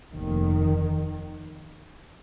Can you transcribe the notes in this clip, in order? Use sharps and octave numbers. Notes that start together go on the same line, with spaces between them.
F1 D#2 D#3